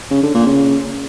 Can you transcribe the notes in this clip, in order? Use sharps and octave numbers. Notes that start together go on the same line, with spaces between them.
C#3
D3
A#2
C#3